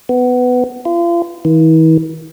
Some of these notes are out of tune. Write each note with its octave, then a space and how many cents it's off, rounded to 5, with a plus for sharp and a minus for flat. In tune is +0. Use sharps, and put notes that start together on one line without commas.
B3 +15
F4 -35
E3 -45